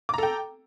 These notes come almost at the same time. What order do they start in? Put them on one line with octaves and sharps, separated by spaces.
D6 A#5 A4 G5